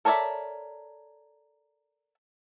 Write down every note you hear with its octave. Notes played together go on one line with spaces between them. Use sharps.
A4 A#4 C#5 D5 E5